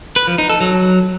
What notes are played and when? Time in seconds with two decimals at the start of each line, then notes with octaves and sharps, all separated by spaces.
0.16 B4
0.27 F3
0.38 D#4
0.49 A4
0.61 F#3